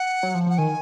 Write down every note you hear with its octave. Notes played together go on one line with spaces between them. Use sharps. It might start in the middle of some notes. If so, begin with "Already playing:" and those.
Already playing: F#5
F#3
F3
F3 F#5
D#3 G#5